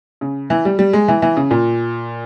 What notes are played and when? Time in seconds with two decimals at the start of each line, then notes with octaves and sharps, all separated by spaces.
0.21 C#3
0.50 E3
0.65 G3
0.79 G3
0.93 G#3
1.08 E3
1.22 E3
1.37 C#3
1.51 A#2